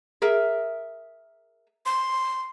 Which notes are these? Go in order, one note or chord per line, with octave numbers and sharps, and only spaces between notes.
G#4 A#4 E5
C6